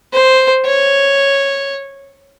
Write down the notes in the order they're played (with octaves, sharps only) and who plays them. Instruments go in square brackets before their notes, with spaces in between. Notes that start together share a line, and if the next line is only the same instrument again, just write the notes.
[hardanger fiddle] C5
C#5